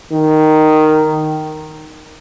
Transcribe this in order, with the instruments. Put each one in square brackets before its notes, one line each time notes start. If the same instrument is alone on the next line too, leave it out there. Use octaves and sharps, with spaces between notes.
[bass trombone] D#3